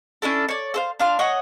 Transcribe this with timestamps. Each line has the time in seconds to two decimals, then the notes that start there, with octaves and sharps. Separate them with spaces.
0.22 C#4 D4 E4 A4
0.49 C#5 D5
0.74 A4 C5 F5
0.99 D4 F5 C6
1.19 C#5 D#5 F#5